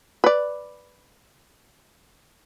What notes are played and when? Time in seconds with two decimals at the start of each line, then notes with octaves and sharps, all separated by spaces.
0.24 B4 D5